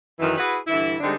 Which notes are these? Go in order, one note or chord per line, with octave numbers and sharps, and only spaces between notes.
F#2 D#3 E3
E4 F#4 G#4 B4
G2 D3 E3 E4
D3 G3 G#3 C4 D4 D#4